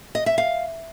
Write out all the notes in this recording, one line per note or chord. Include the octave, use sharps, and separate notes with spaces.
D#5
E5
F5